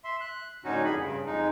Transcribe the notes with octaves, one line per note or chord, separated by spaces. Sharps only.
E5 C6
F#6
F#2 A2 D3 C#4 D#4 F#4
F2 G#4 B5
G2 C#3
F2 G#3 D#4